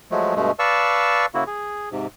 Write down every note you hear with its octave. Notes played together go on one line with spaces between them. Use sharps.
F3 F#3 G#3 A3
G2 B2 G#3 A3
B4 D5 F5 A5 C#6 E6
C#3 A#3 E4 F#4
G#4
G#2 C3